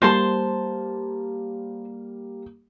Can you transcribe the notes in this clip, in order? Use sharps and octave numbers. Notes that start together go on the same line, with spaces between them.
G3 A#3 C5 A5 C6